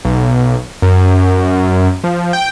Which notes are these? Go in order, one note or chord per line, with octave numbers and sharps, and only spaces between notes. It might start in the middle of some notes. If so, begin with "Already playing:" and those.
B1
F#2
F3
G5